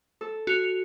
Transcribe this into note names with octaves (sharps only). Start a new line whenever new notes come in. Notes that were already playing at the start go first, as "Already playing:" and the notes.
A4
F#4 F7